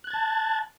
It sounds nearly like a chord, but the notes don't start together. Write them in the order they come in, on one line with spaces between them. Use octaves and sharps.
F#6 G#6 A6 A5